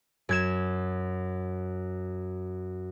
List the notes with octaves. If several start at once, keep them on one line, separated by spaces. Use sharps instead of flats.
F#2 G#6 E7